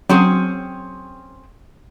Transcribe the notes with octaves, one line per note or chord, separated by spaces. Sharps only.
F#3 C4 C#4 G#4